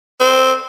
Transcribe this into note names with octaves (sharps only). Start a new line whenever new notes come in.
C4